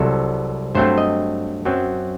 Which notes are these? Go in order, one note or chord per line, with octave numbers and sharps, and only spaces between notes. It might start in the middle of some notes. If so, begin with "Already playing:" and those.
Already playing: C2 C3 F#3 A4
G2 F#3 A3 C4 C5
D#5
F#2 F#3 C4